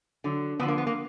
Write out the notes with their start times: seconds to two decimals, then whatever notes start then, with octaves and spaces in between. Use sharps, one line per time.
0.24 D3 F#3
0.60 D3 F3 B3
0.68 A#3
0.78 B3
0.87 A#3